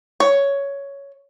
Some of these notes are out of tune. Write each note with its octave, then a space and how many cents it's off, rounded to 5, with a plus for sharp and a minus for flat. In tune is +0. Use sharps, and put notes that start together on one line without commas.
C#5 +10